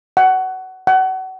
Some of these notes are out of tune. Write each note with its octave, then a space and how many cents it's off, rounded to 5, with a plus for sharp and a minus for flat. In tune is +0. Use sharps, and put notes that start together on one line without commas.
F#5 +20
F#5 +30